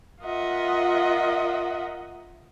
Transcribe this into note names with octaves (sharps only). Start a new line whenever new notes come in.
F4 A#4 D#5 E5 F#5